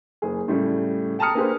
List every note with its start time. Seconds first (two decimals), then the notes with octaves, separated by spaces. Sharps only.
0.22 F#1 G#4
0.48 A2 C#3 G3 A3
1.19 G5 A5 A#5 D#6 F6 C#7
1.35 A#3 D4 G4 G#4 B4 C5